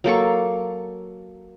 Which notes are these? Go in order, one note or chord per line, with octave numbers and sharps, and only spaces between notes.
F#3 A#3 A4 C#6